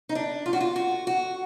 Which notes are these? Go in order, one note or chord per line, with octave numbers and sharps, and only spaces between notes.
D#4
D4
F4
F#4
F4
F#4
F#4